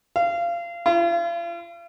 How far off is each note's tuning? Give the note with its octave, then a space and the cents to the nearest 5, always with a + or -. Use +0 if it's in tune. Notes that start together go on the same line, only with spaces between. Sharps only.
F5 -25
F4 -40